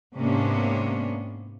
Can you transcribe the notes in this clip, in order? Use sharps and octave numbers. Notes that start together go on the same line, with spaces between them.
G#2 C3 A#3 B3 C#4 D4